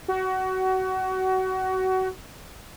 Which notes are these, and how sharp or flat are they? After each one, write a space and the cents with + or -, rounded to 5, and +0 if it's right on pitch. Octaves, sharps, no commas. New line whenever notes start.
F#4 +25